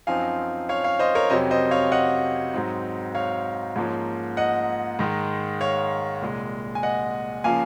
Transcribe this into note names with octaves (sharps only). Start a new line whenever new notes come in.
F#2 F3 C4 D#4 F5 G#5
C#5 F5
C#5 F5
C5 D#5
A#4 C#5
F2 C3 F#3 C#4 C5 D#5
C5 D#5
C#5 F5
D#5 F#5
G#2 F#3 C4 D#4
C#5 F5
G#2 F3 A#3 C#4
D#5 F#5
G#2 D#3 G#3
C#5 F5
C2 A#2 G#3
G#5
D#5 F#5
C#3 F3 A#3 F5 G#5